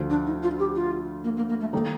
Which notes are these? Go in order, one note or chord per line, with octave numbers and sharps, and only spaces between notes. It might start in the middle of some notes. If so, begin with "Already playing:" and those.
Already playing: D2 D3 F3
D4
D#4
F4
G4
F4
A#3
A#3
A#3
A3
D#3 G3 A#3 D#4 A4